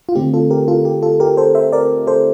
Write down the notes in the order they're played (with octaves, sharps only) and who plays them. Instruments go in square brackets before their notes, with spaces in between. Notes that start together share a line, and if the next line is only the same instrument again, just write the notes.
[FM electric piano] F4
D3 A3 C4 G4
F4 A4
G4 A#4
F4 A4
G4
F4 A4
G4 A#4
A4 C5
C5 E5
A#4 D5
A4 C5